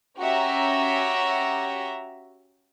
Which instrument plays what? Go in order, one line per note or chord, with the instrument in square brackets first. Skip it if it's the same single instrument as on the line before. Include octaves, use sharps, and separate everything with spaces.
[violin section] C#4 F#4 G4 E5 G5 A#5